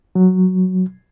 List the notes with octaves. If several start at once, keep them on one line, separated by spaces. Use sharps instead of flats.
F#3